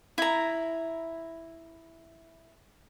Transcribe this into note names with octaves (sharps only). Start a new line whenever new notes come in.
E4 A#5